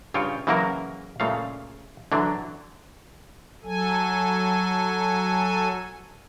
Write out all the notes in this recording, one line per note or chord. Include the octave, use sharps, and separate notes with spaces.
G2 C#3 F4 C#5 G5
C#3 E3 F#3 A#3 F#4 A#4
A#2 C#3 A3 F5
D3 E3 F#3 D4
F#3 A4 G#5